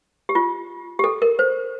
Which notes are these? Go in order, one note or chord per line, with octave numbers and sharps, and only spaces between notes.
G4
F4
G4
A4
A#4
C5